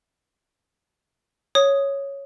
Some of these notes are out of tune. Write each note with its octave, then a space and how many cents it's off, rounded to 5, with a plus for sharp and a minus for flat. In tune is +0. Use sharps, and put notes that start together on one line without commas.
C#5 +0 D#6 +0